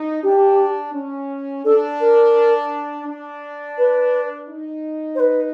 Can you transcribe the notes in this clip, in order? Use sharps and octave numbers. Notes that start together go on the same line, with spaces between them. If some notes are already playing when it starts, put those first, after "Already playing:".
Already playing: D#4
D4 G4
C#4
D4 A4
A#4
D4
B4
D#4
C5
B4